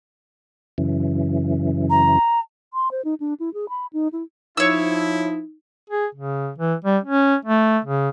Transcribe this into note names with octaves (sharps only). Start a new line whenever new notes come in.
F#2 C#3 E3
A#5
C6
C5
D#4
D4
E4
G#4
B5
D#4
E4
F3 D#4 E4 C#5 E6
G#4
C#3
E3
G3
C#4
A3
C#3